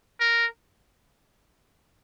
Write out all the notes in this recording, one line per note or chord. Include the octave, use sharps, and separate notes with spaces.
A#4